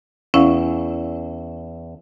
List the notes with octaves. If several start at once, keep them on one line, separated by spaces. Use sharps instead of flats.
E2 C#4 E4 F5